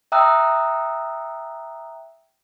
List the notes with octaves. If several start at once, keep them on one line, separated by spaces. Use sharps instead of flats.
E5 G5 A#5 D#6 E6 F#6